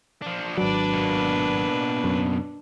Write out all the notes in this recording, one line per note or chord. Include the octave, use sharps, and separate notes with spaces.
F3 D4
G#1 F#3 D4 B4 D5
B2 A#3
F#2